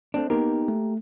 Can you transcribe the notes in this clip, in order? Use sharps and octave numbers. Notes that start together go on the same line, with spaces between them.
A3 C4 D4
A#3 B3 D#4 G4 A#4
A3